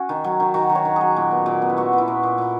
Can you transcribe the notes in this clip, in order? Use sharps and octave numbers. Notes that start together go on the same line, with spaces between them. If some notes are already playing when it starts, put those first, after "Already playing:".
Already playing: C#4 F#4
D#3
F#3
D#3
D#3 F#4
D#3
C#5
D#3
F#3 G#4
A#2
B3
A#2
B3
E4
A#2 F#4
B3
E4
A#2
A#2
A#2